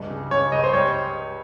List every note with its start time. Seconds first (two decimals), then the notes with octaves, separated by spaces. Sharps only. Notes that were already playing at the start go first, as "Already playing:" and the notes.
Already playing: C#2 G2
0.10 C#3
0.31 C#3 C#5
0.52 C#2 D#5
0.64 C5
0.73 G3 C#5